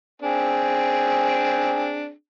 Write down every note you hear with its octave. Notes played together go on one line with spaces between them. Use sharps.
C4 D4 G#4